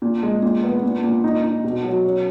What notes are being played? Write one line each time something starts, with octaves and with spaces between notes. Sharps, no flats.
A#2
G#3
A#2
B3
A#2
A#2
D#4
D#4
B2
F#3
C#4